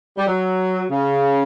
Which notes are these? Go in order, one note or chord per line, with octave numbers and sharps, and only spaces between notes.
G3
F#3
C#3